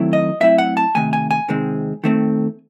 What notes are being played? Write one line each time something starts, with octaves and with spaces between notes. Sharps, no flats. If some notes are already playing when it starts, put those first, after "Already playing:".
Already playing: D#3 F#3 A3 C4 E4
D#5
A2 F#3 C4 E4 E5
F#5
A5
C3 D#3 A3 G#5
G#5
G#5
C3 D#3 G#3 C4
D#3 A3 C4